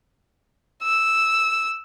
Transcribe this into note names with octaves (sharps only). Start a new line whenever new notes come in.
E6